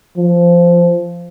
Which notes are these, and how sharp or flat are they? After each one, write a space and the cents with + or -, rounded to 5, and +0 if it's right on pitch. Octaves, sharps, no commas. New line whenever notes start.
F3 -10